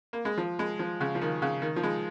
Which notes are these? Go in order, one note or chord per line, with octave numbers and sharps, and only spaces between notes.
A#3
G#3
F3
G#3
F3
C#3
F3
D#3
C#3
D#3
F3
G#3